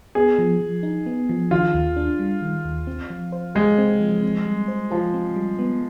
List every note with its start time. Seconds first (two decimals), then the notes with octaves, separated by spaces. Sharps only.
0.15 B3 G#4
0.39 F3
0.61 F3
0.83 D#4
1.06 B3
1.29 F3
1.51 D#3 F4
1.74 D#2
1.96 D4
2.19 G3
2.42 D#3
2.65 D#2
2.87 C4
3.10 F3
3.32 C5
3.55 G#3 G4
3.78 C4
4.00 F3
4.23 C4
4.46 G3
4.68 C5
4.91 F3 G4
5.14 C4
5.36 G3
5.59 B3